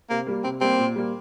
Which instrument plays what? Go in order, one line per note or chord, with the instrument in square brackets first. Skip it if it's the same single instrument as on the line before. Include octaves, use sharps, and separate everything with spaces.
[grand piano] C3 [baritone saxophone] A#3
[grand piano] G3 A#3
[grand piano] C3 [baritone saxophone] C4
[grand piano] G3 A#3 [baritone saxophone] C4
[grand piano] A#2
G3 A#3